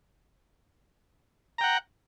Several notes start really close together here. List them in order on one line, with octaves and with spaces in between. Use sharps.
A#5 G5 F#5